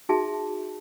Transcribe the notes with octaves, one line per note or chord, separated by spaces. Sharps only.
D#4 F#4 G#4 E5 A5